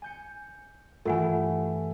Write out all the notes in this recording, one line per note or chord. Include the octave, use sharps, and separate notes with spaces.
G#5 G6 C#7
G2 E3 A3 F4 F#5 G#5